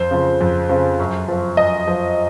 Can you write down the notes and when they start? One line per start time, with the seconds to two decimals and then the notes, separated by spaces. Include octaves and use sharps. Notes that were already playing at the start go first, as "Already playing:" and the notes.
Already playing: F2 C5
0.11 C#3 F3
0.41 F2
0.69 C#3 F3
0.99 F#2
1.28 F3
1.57 F#2 D#5
1.87 F3